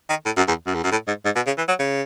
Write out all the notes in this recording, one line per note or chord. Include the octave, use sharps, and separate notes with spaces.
D#3
A2
F#2
E2
F#2
E2
F#2
A2
G#2
G#2
B2
C#3
E3
F#3
C#3